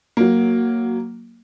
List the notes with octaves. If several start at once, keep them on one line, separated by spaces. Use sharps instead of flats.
F#3 A#3